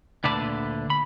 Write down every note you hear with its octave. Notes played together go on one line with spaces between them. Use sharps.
D2 A#2 D3 B4 D5 A5
B5